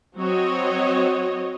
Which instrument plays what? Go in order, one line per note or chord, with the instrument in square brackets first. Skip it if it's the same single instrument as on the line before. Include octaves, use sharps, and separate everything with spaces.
[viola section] F#3 C4 F#4 C#5 D#5